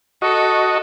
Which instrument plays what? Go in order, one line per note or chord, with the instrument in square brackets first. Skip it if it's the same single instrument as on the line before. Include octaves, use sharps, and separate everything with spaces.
[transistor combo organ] F#4 D#5 C#6 [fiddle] A4